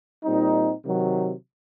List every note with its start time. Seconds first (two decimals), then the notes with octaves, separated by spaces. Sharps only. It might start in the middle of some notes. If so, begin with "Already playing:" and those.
0.24 A#2 G3 C4 D#4
0.85 C3 D#3 F#3